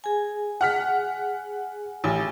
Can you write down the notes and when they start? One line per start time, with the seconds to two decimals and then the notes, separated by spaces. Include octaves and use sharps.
0.04 G#4 G#5
0.61 F#5 F6 B6
2.04 A1 G4 G#5